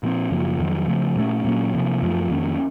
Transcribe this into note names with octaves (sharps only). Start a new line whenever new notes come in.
A#2 F3 C4
F#2 C#3 F3 A#3
F2 D#3 F#3
C#3 F3 A3
A#2 A3 C#4
A#2 F#3 A#3 C#4
C3 F3 A#3
F#2 F3 A3
F2 D#3 A#3 C#4